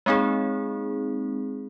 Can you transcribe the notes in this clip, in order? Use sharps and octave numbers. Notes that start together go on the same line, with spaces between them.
G#3 A#3 C4 D#4 G#4